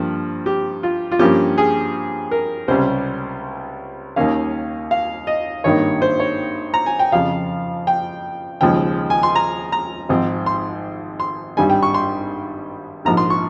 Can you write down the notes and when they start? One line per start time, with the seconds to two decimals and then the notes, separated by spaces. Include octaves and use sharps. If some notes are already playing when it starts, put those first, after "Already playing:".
Already playing: G2 F3 A#3
0.46 G4
0.83 F4
1.12 F4
1.19 G2 F3 A#3 C#4 G4
1.58 G#4
2.31 A#4
2.68 C#2 C3 G3 C#4 C5
4.16 D#2 D#3 A#3 C#4 F5
4.91 F5
5.27 D#5
5.64 G#1 G2 D#3 A#3 C#5
6.02 C5
6.19 C#5
6.74 A#5
6.86 G#5
6.99 G5
7.12 F2 C#3 F3 F5
7.87 G5
8.61 D#2 C#3 F3 G#3 G5
9.10 G#5
9.23 C6
9.35 A#5
9.72 A#5
10.09 G#1 G#2 F3 C4
10.46 C6
11.20 C6
11.57 G#1 G2 G3 G#5
11.70 G5
11.83 C#6
11.94 C6
13.05 A#1 G#2 F3 A#5
13.17 C6
13.30 C#6